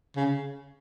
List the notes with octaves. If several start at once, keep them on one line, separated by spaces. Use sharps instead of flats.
C#3